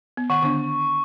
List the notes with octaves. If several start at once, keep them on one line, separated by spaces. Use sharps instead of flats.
B3
D#3 F#5 C#6
D3 B3 D4